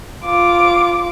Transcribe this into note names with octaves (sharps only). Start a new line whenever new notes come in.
F4 D6